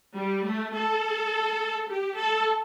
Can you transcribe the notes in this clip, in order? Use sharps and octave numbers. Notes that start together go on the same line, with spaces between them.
G3
A3
A4
G4
A4